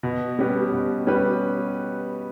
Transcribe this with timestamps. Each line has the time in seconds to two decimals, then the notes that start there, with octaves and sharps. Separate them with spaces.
0.03 B2
0.39 G3 C#4 G4 B4
0.72 B2
1.07 G3 C#4 G4 B4